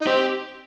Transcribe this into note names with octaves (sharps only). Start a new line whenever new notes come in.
D#4
C4 G4